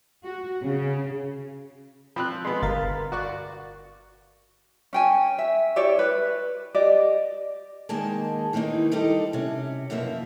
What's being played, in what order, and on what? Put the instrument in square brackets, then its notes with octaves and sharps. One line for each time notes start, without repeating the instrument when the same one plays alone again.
[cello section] F#4
C#3
[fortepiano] F3 C4 [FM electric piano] B5 F#6
[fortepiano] G#3 B3 [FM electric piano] B5 C6
[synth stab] G1 [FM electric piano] A#4 F5 A6
[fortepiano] F#4 D5 C#6
[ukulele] C#4 G5 G#5
E5
E4 G4 C#5 D5
B4
G4 D5 D#5
[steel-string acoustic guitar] D#3 G#3 A#3 G#4 G#5 A5
D#3 E3 A#3 C4 D#4
G3 D#4 G4 A4 C5
C3 C#4
F#2 B2 F3 A#3 E5